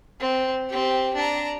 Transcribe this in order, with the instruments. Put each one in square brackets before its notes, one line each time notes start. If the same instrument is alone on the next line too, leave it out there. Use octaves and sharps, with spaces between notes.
[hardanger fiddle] C4
C4 G4
D4 A#5